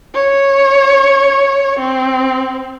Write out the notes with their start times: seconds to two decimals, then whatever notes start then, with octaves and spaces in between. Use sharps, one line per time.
0.14 C#5
1.79 C4